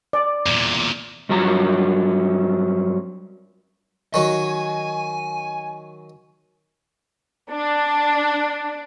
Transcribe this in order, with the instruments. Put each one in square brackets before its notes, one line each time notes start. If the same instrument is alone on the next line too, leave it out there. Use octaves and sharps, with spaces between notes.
[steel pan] D5
[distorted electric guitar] E2 A#2
[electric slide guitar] G2 F3 F#3 A#5
[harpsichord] D#3 F#3 [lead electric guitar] G#5
[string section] D4